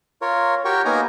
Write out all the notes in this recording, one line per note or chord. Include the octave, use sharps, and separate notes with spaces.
F4 A#4 C#5
F#4 G4 A#4 C#5 G5 C#6
A#3 B3 D#4 A#4 G#5 A#5